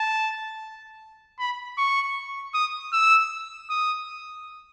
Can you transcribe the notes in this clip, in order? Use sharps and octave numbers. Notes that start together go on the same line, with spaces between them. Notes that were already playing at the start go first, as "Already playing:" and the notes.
Already playing: A5
B5
C#6
D#6
E6
D#6